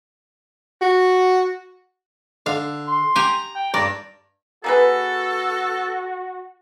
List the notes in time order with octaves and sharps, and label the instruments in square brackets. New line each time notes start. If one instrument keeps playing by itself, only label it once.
[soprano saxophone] F#4
[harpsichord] D3 [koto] F5
[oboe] C6
[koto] G4 G#5 [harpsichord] A#5
[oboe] G5
[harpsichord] G2 [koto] D5 [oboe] A#5
[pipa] A#3 G#4 B4 [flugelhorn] F#4 [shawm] A4